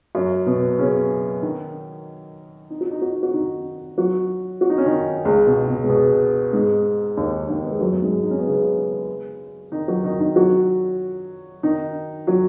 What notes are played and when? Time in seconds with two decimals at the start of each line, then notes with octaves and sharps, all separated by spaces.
0.15 F#2 F#3
0.46 B2 B3
0.79 C#3 C#4
1.42 D#3 D#4
2.70 D#4
2.81 F#4
2.91 D#4
3.02 F#4
3.12 D#4
3.23 F#4
3.34 D#3 D#4
3.98 F#3 F#4
4.61 F#4
4.70 D#4
4.78 C#4
4.86 D#3 D#4
5.25 C#2 C#3
5.47 B2
5.68 B2
5.84 G#3
5.89 B2 B3
6.53 G#2 G#3
7.17 D#2 D#3
7.49 D#2 D#3
7.62 B3
7.71 G#3
7.81 F#2 F#3
7.92 F#3
8.02 G#2 G#3
8.23 D#4
8.31 C#4
8.39 B3
8.46 C#3 C#4
9.72 D#3 D#4
9.88 F#3 F#4
10.04 D#3 D#4
10.20 D#3 D#4
10.36 F#3 F#4
11.63 D#3 D#4
12.27 F#3 F#4